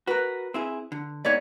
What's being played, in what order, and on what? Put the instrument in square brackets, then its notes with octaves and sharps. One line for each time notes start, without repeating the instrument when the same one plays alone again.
[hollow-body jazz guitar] F#4 A#4 [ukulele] B4
[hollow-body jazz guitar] C4 E4 G#4
D3
[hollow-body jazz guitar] G#2 B3 D#4 [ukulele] C#5 D5